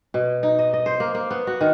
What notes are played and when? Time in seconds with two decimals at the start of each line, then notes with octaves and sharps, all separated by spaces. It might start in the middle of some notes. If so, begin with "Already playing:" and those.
0.14 B2
0.43 D#4
0.59 D#5
0.74 D#5
0.86 C5
1.00 A#3
1.15 A#3
1.31 B3
1.47 F#4
1.61 D#3